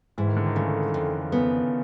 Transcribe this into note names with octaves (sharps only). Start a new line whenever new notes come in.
G#2 E3
D#3
D3
D#3
C#3 A3
F2
C#3 B3